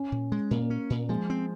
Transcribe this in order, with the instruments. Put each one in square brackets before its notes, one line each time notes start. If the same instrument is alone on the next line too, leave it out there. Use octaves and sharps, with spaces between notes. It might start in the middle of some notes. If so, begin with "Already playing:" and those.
Already playing: [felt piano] C#4
[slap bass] A#2
G#3
[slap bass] A#2 [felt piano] A#3
[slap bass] C#4
A#2
[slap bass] F3 [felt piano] G#3
[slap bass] C4